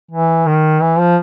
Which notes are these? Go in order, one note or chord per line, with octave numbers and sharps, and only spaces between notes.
E3
D#3
E3
F3